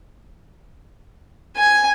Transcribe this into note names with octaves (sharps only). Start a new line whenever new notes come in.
G#5